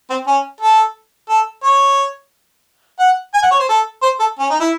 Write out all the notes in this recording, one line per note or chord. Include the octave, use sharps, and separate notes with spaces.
C4
C#4
A4
A4
C#5
F#5
G#5
F#5
C#5
C5
A4
C5
A4
C#4
D#4
E4